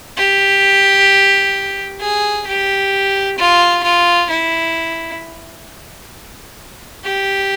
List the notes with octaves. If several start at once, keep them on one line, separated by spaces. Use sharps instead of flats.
G4
G#4
G4
F4
F4
E4
G4